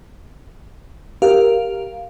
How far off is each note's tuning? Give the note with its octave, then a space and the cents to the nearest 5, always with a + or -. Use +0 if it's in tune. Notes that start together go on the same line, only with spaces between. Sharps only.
G4 +0 A#4 +0 F5 +0